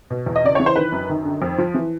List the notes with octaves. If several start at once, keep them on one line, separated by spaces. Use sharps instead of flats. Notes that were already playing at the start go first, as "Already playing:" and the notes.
B2
E2
D#5
C#3 D5
E3 C#5
C5
D#3 B4
F#2
D#3
D3
F2
F3
E3